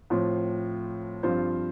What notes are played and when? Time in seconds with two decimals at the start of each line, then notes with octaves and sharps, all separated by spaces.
0.10 A2 F3 C4 F4
1.23 G2 F3 C4 F4 C5